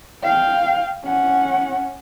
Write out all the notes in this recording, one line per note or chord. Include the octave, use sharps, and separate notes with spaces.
F5 G5
C#4 F#5